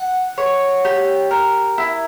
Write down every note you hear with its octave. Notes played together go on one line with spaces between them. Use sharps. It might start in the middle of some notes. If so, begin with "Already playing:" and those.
Already playing: F#5
C#5
G4
A#4
E4